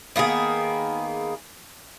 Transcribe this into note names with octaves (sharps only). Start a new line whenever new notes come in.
D#3 A#3 B3 G#4